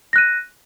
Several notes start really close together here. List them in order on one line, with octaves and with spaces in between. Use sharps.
A#6 F#6 D#7